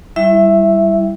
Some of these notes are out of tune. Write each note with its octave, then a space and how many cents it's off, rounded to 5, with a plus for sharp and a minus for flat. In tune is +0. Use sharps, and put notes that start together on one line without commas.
G3 +0 E4 +0 E5 +5